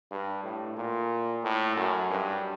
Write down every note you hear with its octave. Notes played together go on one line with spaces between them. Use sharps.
G2
A2
A#2
A2
F#2
G2